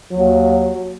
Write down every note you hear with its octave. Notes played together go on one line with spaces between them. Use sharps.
D#2 F#3